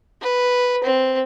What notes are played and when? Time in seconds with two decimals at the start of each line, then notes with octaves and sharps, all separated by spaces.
0.22 B4
0.84 C4